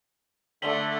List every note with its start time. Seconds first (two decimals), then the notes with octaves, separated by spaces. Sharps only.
0.62 D3 A3 B6 F#7 G7